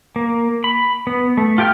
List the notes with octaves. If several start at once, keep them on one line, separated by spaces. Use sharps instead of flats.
A#3
B5
B3
A3
F4 G4 G5 A5 F6